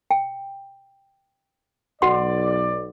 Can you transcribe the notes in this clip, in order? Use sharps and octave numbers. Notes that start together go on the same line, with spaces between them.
G5
B1 F#4 D5 F#5 C6